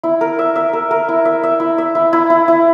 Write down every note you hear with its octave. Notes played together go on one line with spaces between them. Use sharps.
E4
A#4
E5
E5
A#4
A#4
E4
E5
E5
E4
E5
E4
E4
E4
E4